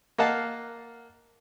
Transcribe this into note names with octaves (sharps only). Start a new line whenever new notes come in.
A#3 D#5 F5 F#5 A5